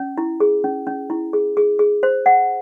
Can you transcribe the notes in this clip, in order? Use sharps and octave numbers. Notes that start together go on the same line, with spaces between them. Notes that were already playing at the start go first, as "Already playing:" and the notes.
Already playing: C#4
E4
G#4
C#4
C#4
E4
G#4
G#4
G#4
C5
F#5